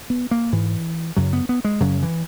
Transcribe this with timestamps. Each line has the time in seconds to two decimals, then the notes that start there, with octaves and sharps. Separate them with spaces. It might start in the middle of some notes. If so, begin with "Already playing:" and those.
0.10 B3
0.31 A#3
0.52 G#2 E3
1.17 F#2 C#3 F#3
1.33 B3
1.49 B3
1.64 G#3
1.80 F#2 C#3 F#3
2.02 E3